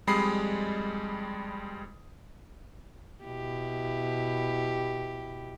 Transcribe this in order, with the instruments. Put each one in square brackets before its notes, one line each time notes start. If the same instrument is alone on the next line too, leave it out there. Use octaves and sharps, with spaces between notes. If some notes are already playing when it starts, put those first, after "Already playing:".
[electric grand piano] F2 G3 G#3 B5 D#6 C7
[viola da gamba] B2 E4 G4